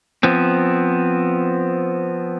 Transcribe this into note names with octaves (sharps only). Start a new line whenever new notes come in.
F3 B3 C4